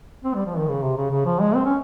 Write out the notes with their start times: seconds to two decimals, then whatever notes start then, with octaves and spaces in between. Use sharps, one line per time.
0.24 C4
0.35 G3
0.46 F3
0.57 D#3
0.68 C#3
0.83 C3
0.97 C#3
1.11 C#3
1.25 F3
1.40 G#3
1.55 C4
1.65 C#4